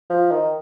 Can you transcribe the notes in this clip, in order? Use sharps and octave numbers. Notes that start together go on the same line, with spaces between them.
F3
D#3